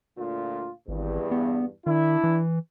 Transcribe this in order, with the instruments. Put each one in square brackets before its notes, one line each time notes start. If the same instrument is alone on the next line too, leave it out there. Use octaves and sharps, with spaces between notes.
[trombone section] D2 A#2 F4
[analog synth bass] G#1 [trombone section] E2 G2
[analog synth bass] B3
[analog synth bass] D#3 [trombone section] D4 E4
[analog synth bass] E3